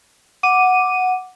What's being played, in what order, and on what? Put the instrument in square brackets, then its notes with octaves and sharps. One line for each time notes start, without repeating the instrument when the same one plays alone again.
[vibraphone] F#5 [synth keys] D6 D#7